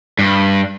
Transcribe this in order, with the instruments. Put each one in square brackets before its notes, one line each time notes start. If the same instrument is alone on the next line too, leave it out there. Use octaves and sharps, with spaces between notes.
[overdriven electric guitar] G2